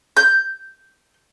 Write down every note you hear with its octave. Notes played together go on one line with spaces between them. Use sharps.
G6